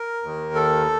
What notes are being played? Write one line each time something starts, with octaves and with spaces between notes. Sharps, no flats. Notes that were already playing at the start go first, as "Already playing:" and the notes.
Already playing: A#4
D#2 D#3
A4